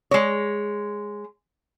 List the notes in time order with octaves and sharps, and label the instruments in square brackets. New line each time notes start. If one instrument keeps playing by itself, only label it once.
[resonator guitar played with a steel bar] G#3 C#5